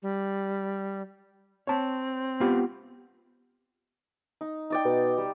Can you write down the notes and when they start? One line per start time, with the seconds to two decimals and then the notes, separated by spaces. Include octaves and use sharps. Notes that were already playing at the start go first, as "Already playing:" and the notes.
0.02 G3
1.67 C4 C#5 A5
2.40 B3 F4 G4
4.41 D#4
4.70 D#4 D5 G5
4.85 B2
5.18 G3